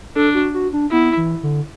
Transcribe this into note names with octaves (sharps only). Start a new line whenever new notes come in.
D4 A4
F#4
F#4
D4
B3 E4
E3
D3